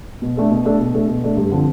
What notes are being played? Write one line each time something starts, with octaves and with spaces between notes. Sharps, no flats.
B2
A3 D4 A4
B2
A3 D4 A4
B2
A3 D4 A4
B2
A3 D4 A4
G2
D3 F3 C4